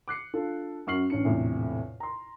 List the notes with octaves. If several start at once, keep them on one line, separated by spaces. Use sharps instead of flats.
D6 F#6 C7 C#7
D4 F4 A4
F#2 F#4 C#6 F6 C7 F#7
A1 C#4 D4 C#7
A#1 E2 A2 C3
A#5 C6